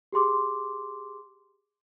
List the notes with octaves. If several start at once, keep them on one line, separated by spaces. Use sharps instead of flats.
G4 G#4 C6 D6